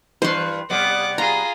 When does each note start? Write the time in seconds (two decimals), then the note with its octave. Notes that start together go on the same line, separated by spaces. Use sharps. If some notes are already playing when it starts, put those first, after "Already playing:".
0.22 G2 E3 B4 C5 C6
0.70 C3 G3 B3 F#5 D6
1.18 F4 G#4 A#5